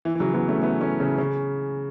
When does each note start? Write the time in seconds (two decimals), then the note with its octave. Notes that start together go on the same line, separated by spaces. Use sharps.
0.05 E3
0.15 E3
0.20 C#3 F#3
0.34 F#3 B3
0.48 A3 C#4
0.62 B3 E4
0.81 A3 C#4
1.00 C#3
1.18 C#3